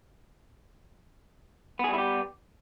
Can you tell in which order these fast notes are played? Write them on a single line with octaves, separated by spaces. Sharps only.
B3 G#4 G3 E4 G4